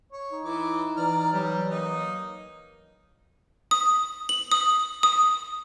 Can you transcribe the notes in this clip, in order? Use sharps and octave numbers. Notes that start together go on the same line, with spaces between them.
C#5
D#4
E3 E4 D6
E3 D5 A#5 F6
F#3 G3
A#3 D#4
D#6
F#7
D#6
D#6